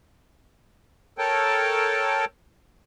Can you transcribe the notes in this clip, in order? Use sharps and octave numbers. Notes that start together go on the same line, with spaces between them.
A4 A#4 C#5 G5 A5